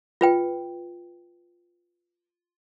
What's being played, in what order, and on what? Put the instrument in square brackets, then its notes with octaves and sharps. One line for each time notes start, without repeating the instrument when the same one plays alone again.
[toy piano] F4 B4 G5